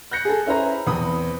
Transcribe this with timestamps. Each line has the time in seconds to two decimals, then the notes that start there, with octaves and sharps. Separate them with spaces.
0.11 F#6 G6 A#6 C#7
0.25 G#4 A4
0.46 C#4 E4 B4 C5 A#5
0.87 E2 C4 B4 B5 D#6